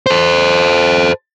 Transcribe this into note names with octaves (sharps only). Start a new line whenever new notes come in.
A4 C5